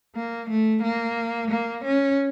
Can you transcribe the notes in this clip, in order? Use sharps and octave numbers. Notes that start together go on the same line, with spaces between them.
A#3
A3
A#3
A#3
C#4